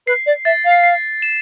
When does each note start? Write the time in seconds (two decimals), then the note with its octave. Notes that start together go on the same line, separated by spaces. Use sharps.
0.07 B4 C7
0.26 D5
0.45 E5 A6
0.65 F5
0.84 C7
1.22 E7